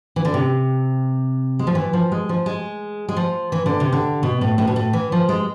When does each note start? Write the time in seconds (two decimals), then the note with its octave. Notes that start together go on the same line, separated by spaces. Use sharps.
0.16 E3
0.25 D3
0.34 C3
1.59 G#3
1.67 F3
1.75 E3
1.93 F3
2.12 G#3
2.29 F3
2.46 G#3
3.08 G#3
3.17 F3
3.52 E3
3.66 D3
3.80 C3
3.93 D3
4.23 B2
4.41 A2
4.58 A2
4.67 B2
4.76 A2
4.93 E3
5.12 F3
5.29 G#3